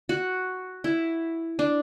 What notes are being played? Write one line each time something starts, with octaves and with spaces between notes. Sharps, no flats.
F#4
E4
D4